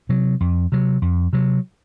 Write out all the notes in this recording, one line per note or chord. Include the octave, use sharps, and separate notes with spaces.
C3 F#3
F2
C3 F#3
F2
C3 F#3